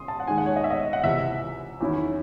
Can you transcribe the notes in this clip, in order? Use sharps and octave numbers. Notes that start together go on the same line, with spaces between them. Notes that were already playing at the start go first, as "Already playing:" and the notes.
Already playing: C#3 C6 D#6
A5
F#5
D#2 D#3 G#3 G#5
F#5
C#5
D#5
E5
D#5
F#5
C#2 C3 E3 E5
E2 D#3 F#3 C#4 E4